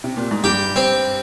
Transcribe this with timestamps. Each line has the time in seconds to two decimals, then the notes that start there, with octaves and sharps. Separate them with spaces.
0.04 C3
0.17 A#2
0.31 G#2
0.44 G2 G4
0.76 C4